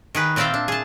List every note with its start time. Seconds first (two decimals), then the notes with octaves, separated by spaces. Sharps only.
0.15 D#3 G#4 B4
0.36 A#2 C4 D5 E5 F5 G5
0.54 D4
0.68 G#4 A5